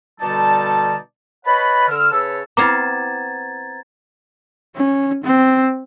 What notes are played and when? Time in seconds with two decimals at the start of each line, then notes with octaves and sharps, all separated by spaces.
0.21 B2 D3 G3 D#4 D5 A5
1.46 B4 C#5 D#5 F#5 A5 B5
1.89 D3 E6 F6
2.12 C#3 B4 C#5 A5 E6
2.57 B3 C4 E4 F5 A#5 D6 G#6 A6
4.76 C#4
5.24 C4